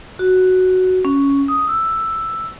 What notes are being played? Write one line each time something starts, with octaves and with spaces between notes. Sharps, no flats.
F#4
C#4
D#6
E6